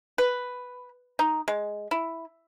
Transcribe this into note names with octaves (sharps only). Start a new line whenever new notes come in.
B4
D#4
G#3
E4